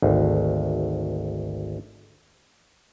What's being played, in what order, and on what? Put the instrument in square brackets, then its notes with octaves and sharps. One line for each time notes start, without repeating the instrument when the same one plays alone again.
[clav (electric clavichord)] G#1 D2